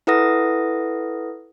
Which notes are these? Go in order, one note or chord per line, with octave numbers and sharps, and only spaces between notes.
E4 A4 B4 F#5 D#6 A#6